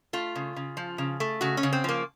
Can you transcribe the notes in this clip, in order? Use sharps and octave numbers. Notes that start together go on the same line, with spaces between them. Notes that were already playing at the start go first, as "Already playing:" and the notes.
A3 F4
C#3
C#3
F3
C#3
A3
C#3 F#4
C#4
C#3
C4
F3 A#3